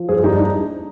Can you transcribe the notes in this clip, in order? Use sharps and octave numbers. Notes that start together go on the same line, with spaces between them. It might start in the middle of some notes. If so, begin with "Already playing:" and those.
Already playing: F3
G2 G#4 C5
G2 D#4 G4
D4
D#4